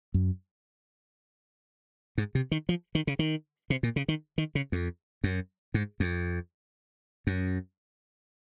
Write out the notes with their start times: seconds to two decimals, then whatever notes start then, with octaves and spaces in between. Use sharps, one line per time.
0.14 F#2
2.18 G#2
2.35 C3
2.51 D#3
2.69 F3
2.95 D#3
3.07 C#3
3.19 D#3
3.70 C3
3.83 A#2
3.96 C#3
4.08 D#3
4.38 D#3
4.55 C#3
4.72 F2
5.24 F#2
5.74 G#2
6.00 F2
7.27 F#2